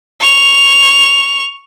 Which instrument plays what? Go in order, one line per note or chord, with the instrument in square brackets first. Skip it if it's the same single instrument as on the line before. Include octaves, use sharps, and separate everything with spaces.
[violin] C#6 F7